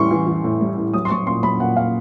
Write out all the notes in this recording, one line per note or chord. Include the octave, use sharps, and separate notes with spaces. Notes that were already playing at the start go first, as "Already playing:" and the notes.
Already playing: A2 E3 G3 C6 C#6
E3
E3
A2
G3
A2
F#3 D#6
C6
F#3 C#6
A#2 C6
F#3 B5
A#2 F#5
A#2 F5